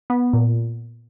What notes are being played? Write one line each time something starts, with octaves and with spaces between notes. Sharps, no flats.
B3
A#2